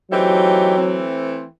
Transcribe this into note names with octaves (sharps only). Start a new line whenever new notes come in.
E3 F#3 A3 C4 D#4 G4
E3 A3 C4